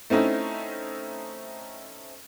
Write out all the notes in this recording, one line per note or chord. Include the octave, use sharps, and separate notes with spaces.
A3 C4 C#4 D#4 E4